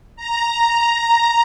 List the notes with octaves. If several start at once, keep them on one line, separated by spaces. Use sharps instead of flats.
A#5